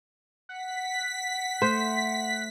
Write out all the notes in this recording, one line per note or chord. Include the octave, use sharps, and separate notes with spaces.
F#5 B6
A3 C5